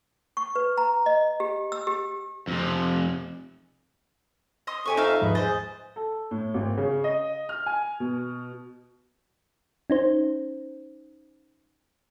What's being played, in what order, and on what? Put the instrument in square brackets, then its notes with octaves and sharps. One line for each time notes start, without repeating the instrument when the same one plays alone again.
[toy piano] C#6
B4
A#5
D#5
G4
E6
G4
[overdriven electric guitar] F2 C3
[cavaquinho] D#5 C6 D#6
[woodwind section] F2 [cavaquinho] G4 G#5 C#6
[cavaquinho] D#4 E5 F5
[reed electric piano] D#2 G#2 F3 [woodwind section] B4 D#5
[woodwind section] G#4 [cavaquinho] C5 D#5 [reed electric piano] A6
[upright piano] A4
A2
G#1
C#3
D#5
F6
G#5
B2
[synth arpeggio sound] C#4 D#4 C5